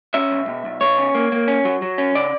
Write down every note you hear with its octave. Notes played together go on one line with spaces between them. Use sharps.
C#4 E5
B1
B2
B1
B2 C#5
C#4
A#3
A#3
C#4
F#3
F#3
C#4
C#3 D5